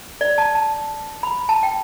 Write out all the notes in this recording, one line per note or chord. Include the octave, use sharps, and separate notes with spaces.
D5
A5
A5
B5
A5
G5